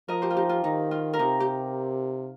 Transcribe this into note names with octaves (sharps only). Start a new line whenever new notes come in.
F3 A#4 D#5
G4 C5
F4
D#4 G4
F4
D#3 D#4
F4
A#4
C3 D#4 G4
G4